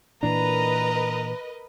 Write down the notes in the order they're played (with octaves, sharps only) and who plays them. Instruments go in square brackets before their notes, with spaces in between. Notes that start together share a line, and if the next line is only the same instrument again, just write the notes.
[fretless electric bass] A#2 E3 D4 [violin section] A#4 B4 D#5 [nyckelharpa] A#5